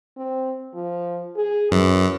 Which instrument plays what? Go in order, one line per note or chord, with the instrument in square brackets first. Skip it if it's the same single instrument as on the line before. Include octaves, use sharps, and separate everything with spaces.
[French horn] C4
F3
G#4
[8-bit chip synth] F#2 [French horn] E3